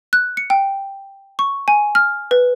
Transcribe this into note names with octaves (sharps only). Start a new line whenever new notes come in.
F#6
C#7
G5
C#6
G#5
F6
B4